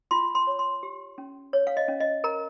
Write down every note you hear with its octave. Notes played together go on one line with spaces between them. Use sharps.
F4 C6
C6
C#5
C6
G4
C#4
C#5
F5
D#5
C#4
D#5
A#4 A#5